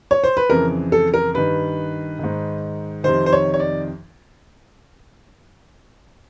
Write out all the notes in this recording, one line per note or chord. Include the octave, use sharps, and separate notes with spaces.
C#5
C5
B4
F2 C#3 E3 A#4
A4
A#4
G2 D#3 B4
G#2 D#3
F2 C3 D#3 C5
C5
C#5
C#5
D5